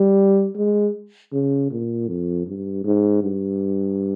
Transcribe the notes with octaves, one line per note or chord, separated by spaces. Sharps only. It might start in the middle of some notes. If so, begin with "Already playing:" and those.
Already playing: G3
G#3
C#3
A#2
F2
G2
G#2
G2